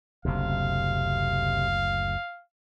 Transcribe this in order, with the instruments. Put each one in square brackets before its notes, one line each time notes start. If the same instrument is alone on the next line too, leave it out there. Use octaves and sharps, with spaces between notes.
[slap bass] F#1 D2 [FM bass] C3 [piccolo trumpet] F5